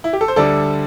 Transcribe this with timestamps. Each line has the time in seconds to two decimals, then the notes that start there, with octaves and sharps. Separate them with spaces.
0.04 E4
0.13 G4
0.21 A4
0.28 C5
0.36 D2 D3 G3 A4 D5